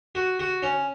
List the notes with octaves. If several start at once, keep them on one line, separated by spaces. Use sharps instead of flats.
F#4
F#4
C#4